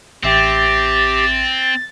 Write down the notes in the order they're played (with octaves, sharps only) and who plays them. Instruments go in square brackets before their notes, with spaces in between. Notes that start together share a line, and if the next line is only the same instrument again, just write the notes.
[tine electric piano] A1 E5 G5 [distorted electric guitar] C4 [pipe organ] G4 [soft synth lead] A6